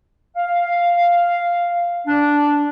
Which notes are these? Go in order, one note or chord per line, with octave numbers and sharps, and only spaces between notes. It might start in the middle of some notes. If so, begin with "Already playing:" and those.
F5
D4